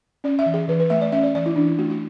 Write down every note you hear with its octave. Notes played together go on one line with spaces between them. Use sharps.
C#4 D5
E5
E3
G#4
E3 B4
B4
A3 E5
D5
C#4 E5
D5
E3 D5
E4
E3 D4
E4
A3 F#4
F#4